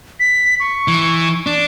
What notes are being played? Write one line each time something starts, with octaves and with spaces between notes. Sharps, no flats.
B6
C#6
E3
D4